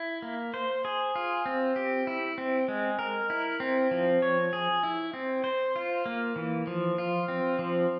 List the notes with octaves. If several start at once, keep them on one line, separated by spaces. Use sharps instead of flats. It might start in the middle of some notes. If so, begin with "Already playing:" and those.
Already playing: E4
A#3
C5
G#4
F4
C4
G4
E4
C4
G#3
A#4
E4
C4
F3
C#5
G#4
E4
C4
C5
F4
A#3
E3
F3
F4
C4
F3